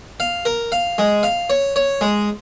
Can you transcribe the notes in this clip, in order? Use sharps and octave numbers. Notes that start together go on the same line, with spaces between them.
F5
A#4
F5
G#3
F5
C#5
C#5
G#3